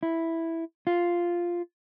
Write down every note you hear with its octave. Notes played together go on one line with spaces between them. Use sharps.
E4
F4